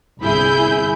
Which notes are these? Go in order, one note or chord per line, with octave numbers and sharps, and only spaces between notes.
G1 C2 E4 G#4 B5 G6